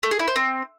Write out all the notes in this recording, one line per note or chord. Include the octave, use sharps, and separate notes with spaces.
A3
G#4
E4
C5
C4